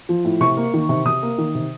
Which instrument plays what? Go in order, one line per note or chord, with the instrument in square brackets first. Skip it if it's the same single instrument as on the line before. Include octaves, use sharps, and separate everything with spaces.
[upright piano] F3
A2
C3 C#6
A#3
D#3
C3
C3 D#6
A#3
D#3
C3